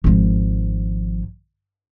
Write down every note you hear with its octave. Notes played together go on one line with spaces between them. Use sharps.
G#1 F3